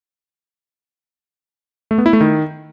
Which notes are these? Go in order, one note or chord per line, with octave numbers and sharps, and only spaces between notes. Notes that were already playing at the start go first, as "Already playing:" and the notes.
A3
B3
E4
A3
D#3